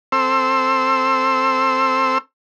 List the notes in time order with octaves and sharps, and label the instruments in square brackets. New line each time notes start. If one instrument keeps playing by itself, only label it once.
[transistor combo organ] C4 A4 C6 E6